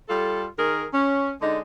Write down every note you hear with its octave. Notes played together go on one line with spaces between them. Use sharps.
G3 F4 A4
D#3 G#4 A#4
C#4
D3 G#3 D4 D#4